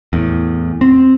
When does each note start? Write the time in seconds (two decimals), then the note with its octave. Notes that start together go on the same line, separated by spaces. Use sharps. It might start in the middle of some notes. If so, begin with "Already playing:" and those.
0.13 E2 A2
0.81 C4